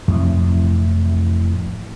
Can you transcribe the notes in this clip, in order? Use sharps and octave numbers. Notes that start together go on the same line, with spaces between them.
F2 A2 C3 E3